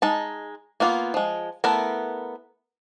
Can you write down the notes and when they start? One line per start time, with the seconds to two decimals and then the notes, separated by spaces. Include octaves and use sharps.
0.02 G#3 D#4 A5
0.80 A#3 B3 F4
1.14 F3 G#3
1.64 A3 B3 E4 A4 A#4